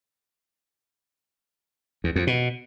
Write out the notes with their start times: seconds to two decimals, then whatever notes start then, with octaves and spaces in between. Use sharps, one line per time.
2.04 E2
2.16 F2
2.27 B2